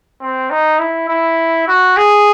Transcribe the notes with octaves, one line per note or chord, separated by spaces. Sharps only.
C4
D#4
E4
E4
F#4
G#4